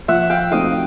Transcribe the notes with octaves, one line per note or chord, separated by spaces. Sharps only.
F3 E5 F#5
F5 G5
A3 C4 D#4 F#4 D#5 F5